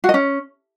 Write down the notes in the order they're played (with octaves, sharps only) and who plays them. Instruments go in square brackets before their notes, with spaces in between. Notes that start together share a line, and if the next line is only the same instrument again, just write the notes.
[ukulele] F#4
D#5
C#4